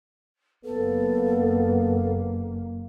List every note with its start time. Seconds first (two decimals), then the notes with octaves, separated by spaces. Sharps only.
0.65 F#1 A#3 B3 A4